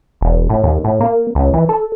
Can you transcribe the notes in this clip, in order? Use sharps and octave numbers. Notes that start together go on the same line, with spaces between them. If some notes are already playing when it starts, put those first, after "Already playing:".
E1
A2
D#2
A2
A#3
C#2
E3
A4